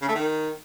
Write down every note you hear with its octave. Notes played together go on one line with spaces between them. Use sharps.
C#3
A3
D#3